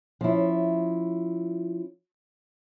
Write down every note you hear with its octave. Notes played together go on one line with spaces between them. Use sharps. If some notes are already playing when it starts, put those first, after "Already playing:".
F3 C#4 E4